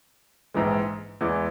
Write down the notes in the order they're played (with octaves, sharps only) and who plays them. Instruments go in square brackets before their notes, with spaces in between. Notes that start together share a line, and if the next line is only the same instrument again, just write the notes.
[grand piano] A#1 G#2 E3 G#3
E2 E3 G#3